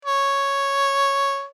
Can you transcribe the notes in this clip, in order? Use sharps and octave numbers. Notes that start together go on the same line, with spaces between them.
C#5